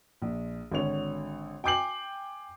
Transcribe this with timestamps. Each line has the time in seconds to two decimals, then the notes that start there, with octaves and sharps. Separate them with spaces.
0.22 A#1
0.72 G#1 D3 C#5 F7
1.64 G5 G#5 D6 G6 C7 F#7